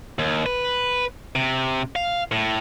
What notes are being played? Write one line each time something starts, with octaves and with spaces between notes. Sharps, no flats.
D#2
B4
C3
F5
A2